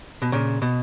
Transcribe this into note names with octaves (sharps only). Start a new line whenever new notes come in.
B2
A#2 C#3
B2